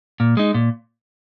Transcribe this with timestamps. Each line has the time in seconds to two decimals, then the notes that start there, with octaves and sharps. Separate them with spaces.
0.20 A#2
0.37 G#3 D#4
0.54 A#2